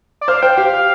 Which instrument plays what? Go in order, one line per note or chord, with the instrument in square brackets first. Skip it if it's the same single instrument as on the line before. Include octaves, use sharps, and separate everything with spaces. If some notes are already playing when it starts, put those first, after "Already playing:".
[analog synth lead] D5
[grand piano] C5 [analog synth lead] F5
[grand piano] C5 [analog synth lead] G5
[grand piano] G4 [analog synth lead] F5